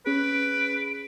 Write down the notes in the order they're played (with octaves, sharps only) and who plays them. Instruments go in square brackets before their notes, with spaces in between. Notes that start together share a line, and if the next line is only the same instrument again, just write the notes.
[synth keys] C#4 G#4 [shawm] B4 [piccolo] D7